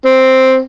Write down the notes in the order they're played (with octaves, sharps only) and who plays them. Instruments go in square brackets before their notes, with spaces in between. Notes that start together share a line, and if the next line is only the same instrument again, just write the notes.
[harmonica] C4